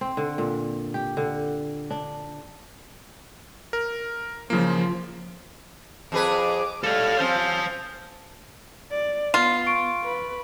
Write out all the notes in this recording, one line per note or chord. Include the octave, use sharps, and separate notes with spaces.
C4
D3
A#2
G4
D3
D4
A#4
C#3 F3 A#3
F2 G#4 B4 D6
G3 A4 C#5 F5 F6
C4 C#4 C5 A5
D5
B3 F4 C6
C#6 D7
B4